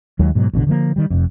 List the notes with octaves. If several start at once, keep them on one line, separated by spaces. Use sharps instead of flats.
D#2 F#3 G#3
G#2 B2 F#3
A1 B2 D3
D3 F3 A#3
D#3 G3
F1 F2